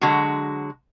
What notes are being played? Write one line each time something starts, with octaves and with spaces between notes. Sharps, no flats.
D3 F#3 G#3 F#4